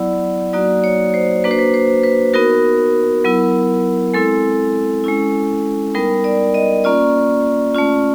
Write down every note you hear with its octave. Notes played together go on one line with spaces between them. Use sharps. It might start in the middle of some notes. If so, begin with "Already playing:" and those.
Already playing: F#3 B3 E4 D5
F#3 A#3 D#4 F#4 D5
C#5
C5
A#3 D4 F#4 B4
C5
B4
C5
B4
B3 D#4 F#4 A#4
F#3 B3 E4
G#3 C4 E4 A4
G#3 C#4 E4
G3 B3 D#4 A#4
D5
D#5
A#3 C#4 F4 D5
A3 C#4 F4